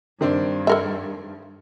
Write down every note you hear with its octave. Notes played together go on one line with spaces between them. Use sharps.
G2 D#3 C4 D4
A4 A#4 E5